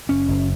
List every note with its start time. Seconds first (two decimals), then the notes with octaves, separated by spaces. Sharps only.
0.09 F#1 C#4
0.28 F#1